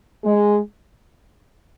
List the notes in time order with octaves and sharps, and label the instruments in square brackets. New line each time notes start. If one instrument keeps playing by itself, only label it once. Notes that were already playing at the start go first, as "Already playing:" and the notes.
[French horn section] G#3